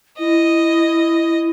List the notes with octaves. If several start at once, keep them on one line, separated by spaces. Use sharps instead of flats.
E4 D#5